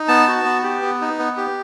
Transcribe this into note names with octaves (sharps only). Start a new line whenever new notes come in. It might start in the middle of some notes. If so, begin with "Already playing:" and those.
Already playing: D#4
B3 A5
F#4
B3
G4
B3
D#4
B3
G4